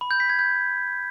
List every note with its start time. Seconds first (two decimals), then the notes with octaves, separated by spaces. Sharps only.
0.01 B5
0.11 G6
0.20 B6
0.29 G#6
0.39 G6